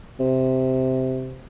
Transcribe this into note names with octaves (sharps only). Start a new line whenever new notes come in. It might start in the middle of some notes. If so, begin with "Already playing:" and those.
C3